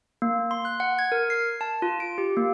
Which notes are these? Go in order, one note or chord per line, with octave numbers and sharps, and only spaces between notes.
A#3
C6
F#6
F#5
G#6
A#4
C7
A5
F4
D7
G4
A#3